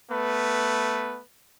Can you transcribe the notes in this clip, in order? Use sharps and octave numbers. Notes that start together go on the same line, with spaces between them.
A3 B3 B4